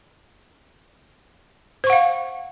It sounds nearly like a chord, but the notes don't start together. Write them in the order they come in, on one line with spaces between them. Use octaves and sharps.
C5 C#6 F#5 F5